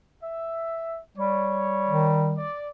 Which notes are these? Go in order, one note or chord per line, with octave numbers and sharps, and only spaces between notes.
E5
G3 C#5
D#3
D5